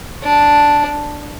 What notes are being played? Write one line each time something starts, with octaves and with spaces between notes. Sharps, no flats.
D4